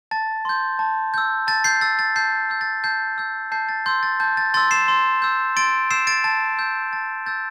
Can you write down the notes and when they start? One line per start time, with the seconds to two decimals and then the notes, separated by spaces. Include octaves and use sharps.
0.11 A5 A6
0.45 C6 G6
0.79 A5
1.14 E6 G6
1.47 A5 A6
1.64 G6 C7
1.81 E6 G6 A6
1.99 A6
2.16 A5 G6 C7
2.50 E6 G6
2.61 A6
2.84 A5 G6 C7
3.18 E6 G6
3.52 A5 G6 C7
3.69 A6
3.86 C6 E6 G6
4.03 A6
4.20 A5 G6
4.37 A6
4.54 C6 E6 A6
4.71 C7 E7
4.88 C6
5.22 E6 G6
5.56 C6 A6 D7
5.90 E6 G6 C7 E7
6.07 A6 D7
6.24 A5 A6
6.58 E6 G6
6.93 A5 A6
7.26 E6 G6 A6